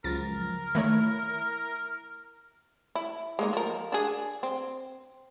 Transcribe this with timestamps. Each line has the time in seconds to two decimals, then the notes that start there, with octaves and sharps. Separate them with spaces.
0.04 C#2 F#2 F3 A#4 A6 A#6
0.75 D#3 A3 E4 C#5
2.95 E4
3.39 G#3 A#3 D#4
3.53 F3 A#4
3.92 D4 G#4
4.43 C4